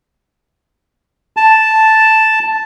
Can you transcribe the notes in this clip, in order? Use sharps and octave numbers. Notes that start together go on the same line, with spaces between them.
A5